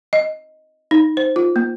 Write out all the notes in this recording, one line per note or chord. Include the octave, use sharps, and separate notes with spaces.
D#5
D#4
C5
F4
A#3